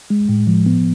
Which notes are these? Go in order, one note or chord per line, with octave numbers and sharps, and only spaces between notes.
G#3
A2
F3
B3